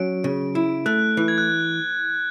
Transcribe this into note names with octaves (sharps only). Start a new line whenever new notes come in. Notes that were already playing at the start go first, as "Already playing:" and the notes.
Already playing: F#3 C#4 D7
C#3
E4
A3 F#6
E3
G#6
F#6